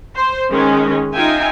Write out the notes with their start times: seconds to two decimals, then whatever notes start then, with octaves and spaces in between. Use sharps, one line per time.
0.16 C5
0.50 D#3 G#3 C#4
1.13 D#4 F4 E5 G5 G#5